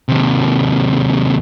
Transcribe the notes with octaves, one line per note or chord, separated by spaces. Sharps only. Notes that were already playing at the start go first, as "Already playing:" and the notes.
D#2 C3